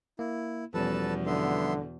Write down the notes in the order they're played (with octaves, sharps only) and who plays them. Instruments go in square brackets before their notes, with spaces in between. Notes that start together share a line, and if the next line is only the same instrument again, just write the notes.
[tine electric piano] A#3 [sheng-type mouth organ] E4
[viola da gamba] E2 B2 [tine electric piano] F3 G3 C#4 [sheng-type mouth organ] A4 B4 A5
[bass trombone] D3 [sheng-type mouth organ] B3 E5 C6